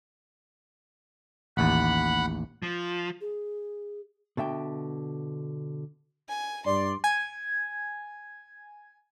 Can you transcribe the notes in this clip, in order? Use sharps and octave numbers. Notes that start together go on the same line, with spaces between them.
A1 D#2 F#5 B5
F3
G#4
B2 D3 E5 G5
G#5
G2 D5 C6
G#5 G#6